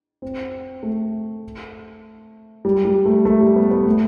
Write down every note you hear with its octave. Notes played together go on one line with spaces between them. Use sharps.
C4
A3
G3
G3
A3
A3
G3
B3
B3
A3